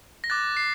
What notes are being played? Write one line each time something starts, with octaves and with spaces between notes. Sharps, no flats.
A#6
D6 F#6 A6
C7